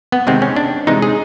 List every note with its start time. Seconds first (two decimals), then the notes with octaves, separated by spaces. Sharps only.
0.12 B3
0.27 C3 D#3 G#3 C4
0.42 C#4
0.56 D4
0.87 C3 E3 G#3 D#4
1.02 G#4